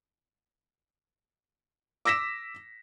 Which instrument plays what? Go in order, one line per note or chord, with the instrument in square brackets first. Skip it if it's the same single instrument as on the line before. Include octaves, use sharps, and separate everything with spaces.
[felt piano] D6 E6 A#6 B6 E7